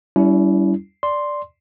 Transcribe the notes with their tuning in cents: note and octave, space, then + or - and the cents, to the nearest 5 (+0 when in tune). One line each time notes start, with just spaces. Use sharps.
G3 -20 C#4 +40 E4 +0
D5 +0 C6 +0